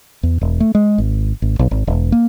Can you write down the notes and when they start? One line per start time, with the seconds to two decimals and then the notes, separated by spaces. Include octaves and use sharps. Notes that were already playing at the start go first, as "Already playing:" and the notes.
0.23 E2
0.41 E1
0.60 A3
0.75 G#3
0.98 G#1
1.42 G#1
1.59 B1
1.71 G#1
1.87 E1
2.12 A#3